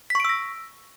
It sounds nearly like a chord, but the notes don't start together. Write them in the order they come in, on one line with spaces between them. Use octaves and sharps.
B6 C#6 D7 E6 A#6